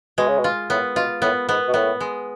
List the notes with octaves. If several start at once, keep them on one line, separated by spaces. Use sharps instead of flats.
B2 G#3
C#3
B2
F4
A2 B3
B2 F4
A2 B3
G#2 B3
B2
A2 B3
G#3